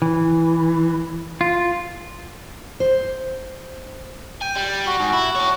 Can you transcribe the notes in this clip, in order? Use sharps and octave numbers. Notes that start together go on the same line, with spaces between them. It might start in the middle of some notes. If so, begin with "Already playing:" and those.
E3
F4
C5
G5 G#5
G3
F#4
G#2
E4
C#5 A5